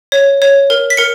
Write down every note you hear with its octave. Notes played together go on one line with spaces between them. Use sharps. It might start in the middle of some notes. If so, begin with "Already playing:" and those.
C#5
C#5
A#4
B6
A#4 C#7